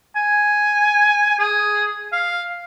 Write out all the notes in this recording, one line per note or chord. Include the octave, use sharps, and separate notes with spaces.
G#5
G#4
F5